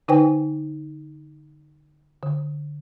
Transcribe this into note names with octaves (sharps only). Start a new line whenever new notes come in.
D3 D#4 B4 C5 G5 G#5
D3